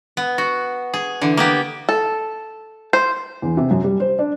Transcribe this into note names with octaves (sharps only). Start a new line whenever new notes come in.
B3
F#4
G#4
D3 E3
A#3 B3 G4
A4
C5
E2
C3
F#2
G3
C5
D4